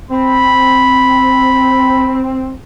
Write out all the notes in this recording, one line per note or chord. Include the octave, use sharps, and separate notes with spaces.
C4 B5